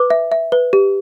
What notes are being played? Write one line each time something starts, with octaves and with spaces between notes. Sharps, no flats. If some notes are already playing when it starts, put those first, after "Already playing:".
Already playing: B4 D6
E5
E5
B4
G4